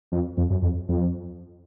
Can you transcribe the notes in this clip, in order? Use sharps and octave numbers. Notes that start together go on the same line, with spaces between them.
F2
F2
F#2
F2
F2